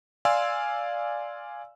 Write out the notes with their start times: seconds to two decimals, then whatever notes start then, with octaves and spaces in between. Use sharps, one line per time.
0.25 D5 F5 G#5 C6 E6